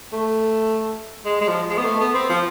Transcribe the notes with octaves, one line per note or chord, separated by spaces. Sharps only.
A3
G#3
G#3
F3
G#3
B3
A3
B3
C4
F3